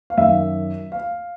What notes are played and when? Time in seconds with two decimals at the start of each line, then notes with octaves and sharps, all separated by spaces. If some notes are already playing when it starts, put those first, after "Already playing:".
0.10 F5
0.17 F#2 D#3 E5
0.92 F5